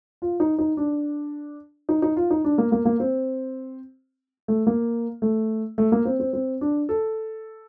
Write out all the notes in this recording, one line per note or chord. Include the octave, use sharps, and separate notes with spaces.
F4
D#4
D#4
D4
D#4
D#4
F4
D#4
D4
A#3
A#3
A#3
C4
A3
A#3
A3
A3
A#3
C4
C4
C4
D4
A4